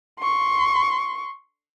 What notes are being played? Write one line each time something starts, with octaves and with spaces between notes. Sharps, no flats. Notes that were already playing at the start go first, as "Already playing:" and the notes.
C6 C#6